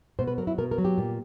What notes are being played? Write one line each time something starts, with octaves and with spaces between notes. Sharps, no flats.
B2 C5
B4
F#3 A#4
E4
B2 A#4
A#4
F#3
G4
A#2